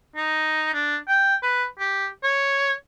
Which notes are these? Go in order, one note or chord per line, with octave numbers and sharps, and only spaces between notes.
D#4
D4
G5
B4
G4
C#5